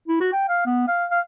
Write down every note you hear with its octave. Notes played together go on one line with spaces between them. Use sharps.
E4
F#4
G5
F5
B3
F5
F5